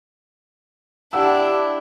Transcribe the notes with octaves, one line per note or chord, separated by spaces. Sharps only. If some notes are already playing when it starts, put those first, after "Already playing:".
D4 E4 G4 F#5 E6